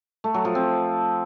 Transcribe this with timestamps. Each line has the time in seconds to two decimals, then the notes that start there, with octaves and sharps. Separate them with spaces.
0.24 A3
0.34 F#3
0.45 F3
0.55 C4